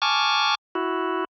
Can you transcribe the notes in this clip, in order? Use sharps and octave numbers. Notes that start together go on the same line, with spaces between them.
G#5 A5 C#6 D6 F6
E4 F#4